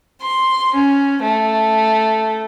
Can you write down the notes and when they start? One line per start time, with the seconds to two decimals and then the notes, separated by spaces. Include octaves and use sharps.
0.21 C6
0.74 C#4
1.22 A3